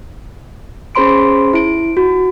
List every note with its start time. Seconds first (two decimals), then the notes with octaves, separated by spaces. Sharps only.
0.95 C#4 G#4 C5 B5 C6 D7
1.53 E4 D7
1.97 F#4